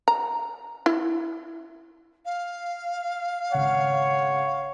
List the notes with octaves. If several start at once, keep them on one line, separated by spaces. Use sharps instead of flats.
A#5
E4
F5
G#1 C#3 C#5 F#5